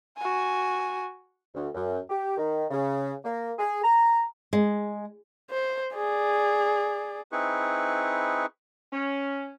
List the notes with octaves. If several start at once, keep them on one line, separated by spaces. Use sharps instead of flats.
F#4 G#5
D2
F#2
G4
D#3
C#3
A#3
G#4
A#5
G#3
C5
G#4 D5
C4 D#4 E4 G#4 B4 C#6
C#4